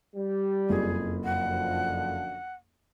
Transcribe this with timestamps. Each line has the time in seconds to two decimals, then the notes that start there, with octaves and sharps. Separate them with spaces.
0.16 G3
0.69 F#1 F2 G#4
1.25 F#2 D3 F3 F#5